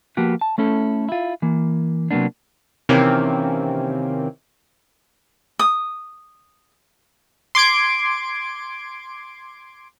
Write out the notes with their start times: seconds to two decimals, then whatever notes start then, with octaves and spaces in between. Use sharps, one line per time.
0.17 F3 A#3 B3 F#4 G4
0.41 A5
0.58 A3 C#4 E4 A4
1.09 E4 F4
1.42 E3 A#3
2.11 C3 F#3 G#3 A#3 B3 D4
2.89 C3 D#3 E3 A#3 C4 C#4
5.59 D#6
7.55 C6 D6 G#6 D7